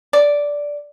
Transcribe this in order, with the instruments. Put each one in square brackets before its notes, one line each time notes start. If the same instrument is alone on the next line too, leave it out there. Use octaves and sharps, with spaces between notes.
[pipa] D5